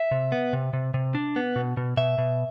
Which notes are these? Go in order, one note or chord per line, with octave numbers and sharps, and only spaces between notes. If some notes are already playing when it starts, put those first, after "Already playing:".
Already playing: E5
C3
B3
C3
C3
C3
D4
B3
B2
B2
B2 E5
B2